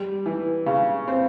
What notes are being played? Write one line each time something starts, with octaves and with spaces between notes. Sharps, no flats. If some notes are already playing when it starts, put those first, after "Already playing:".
Already playing: G3
E3
C#3
C4